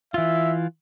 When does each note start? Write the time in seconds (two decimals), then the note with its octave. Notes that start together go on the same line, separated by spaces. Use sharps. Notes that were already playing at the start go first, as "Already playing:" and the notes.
0.14 E3 F4 E5